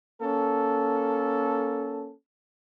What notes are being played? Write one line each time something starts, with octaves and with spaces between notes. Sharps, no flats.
A#3 C#4 A4